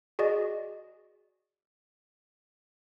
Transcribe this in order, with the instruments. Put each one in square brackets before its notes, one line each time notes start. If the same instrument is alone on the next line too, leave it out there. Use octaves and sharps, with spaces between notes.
[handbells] F#4 G#4 D5 D#5